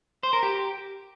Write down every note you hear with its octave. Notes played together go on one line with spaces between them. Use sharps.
C5
A#4
G4